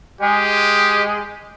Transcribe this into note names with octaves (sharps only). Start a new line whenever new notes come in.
G#3 G4